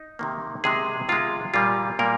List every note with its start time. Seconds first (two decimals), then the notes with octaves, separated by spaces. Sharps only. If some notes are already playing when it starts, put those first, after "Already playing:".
Already playing: D#4
0.19 C3 D#3 A#3
0.64 C3 D#3 G#3 G#4
1.09 C3 D#3 G#3 F4
1.54 A#2 G3 A#3 F4
1.99 A#2 G3 A#3 A#4